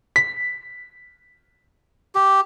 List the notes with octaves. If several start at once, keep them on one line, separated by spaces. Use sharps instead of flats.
B6
G4